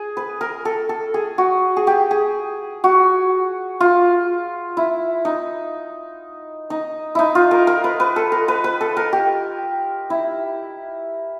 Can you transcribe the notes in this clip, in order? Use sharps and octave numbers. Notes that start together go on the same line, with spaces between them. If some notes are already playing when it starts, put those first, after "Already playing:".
Already playing: G#4
B4
A#4
A4
A4
G#4
F#4
G#4
G4
G#4
F#4
F4
E4
D#4
D#4
D#4 E4
F4
A#4
A#4
B4
B4
A4
A#4
B4
B4
A4
A#4
G4
E4